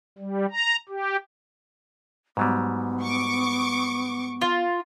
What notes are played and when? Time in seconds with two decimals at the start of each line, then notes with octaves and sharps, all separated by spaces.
0.18 G3
0.51 A#5
0.89 G4
2.37 G#2 F#3 G3 B3
3.03 C#6 D6
4.41 F4